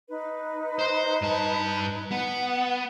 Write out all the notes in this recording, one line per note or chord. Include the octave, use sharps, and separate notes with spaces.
D#4 B4
C5 C6
G2 A5
B3 F#5